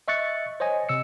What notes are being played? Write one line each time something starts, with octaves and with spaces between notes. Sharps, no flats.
D#5 E5 C#6 F#6 A6 C#7
C5 C#5 D#5 G#5
C3 E6 C#7